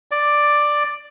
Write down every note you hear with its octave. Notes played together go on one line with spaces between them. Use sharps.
D5